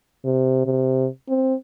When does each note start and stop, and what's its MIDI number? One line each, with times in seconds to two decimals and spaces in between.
0.24 0.62 48
0.66 1.07 48
1.29 1.55 60